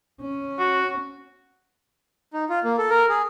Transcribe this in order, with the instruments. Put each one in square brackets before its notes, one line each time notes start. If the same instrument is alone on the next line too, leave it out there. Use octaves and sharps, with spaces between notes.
[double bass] C#4
[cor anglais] F#4
[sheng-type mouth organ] D#4
F4
A#3
A4
A#4
G#4